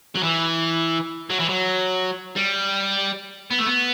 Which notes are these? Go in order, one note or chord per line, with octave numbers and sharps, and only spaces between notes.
F#3
E3
F#3
E3
F#3
G3
B3
A3
B3